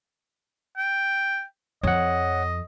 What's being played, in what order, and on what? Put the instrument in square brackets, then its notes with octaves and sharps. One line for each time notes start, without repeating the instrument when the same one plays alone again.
[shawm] G5
[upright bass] F2 [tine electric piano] C#5 F#5 [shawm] D#5